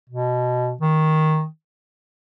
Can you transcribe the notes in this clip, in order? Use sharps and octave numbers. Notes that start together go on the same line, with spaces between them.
B2
D#3